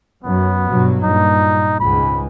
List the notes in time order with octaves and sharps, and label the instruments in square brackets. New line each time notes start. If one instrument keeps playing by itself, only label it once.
[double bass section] F#2 [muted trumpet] B3
[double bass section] G2 B2 F#3
[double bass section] G2 A#2 [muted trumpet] D#4
[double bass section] C#2 G#2 [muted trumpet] B5